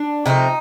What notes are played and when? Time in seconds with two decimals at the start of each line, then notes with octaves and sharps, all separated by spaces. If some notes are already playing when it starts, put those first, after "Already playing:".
Already playing: D4
0.26 C3 F3 A3 D#4